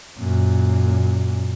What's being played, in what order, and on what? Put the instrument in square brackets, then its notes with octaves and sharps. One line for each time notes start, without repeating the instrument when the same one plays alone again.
[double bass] F#2 A#2